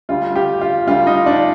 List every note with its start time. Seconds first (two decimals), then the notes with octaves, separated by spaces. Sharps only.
0.09 D2 D3 G3 F4
0.36 G4
0.61 F4
0.87 D2 D3 G3 F4
1.07 D#4
1.26 D4